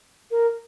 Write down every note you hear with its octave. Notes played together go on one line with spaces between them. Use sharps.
A#4